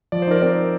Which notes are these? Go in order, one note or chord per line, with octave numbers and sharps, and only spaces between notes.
F3 D5
C5
D#4 A#4 D5
C4 A#4 D5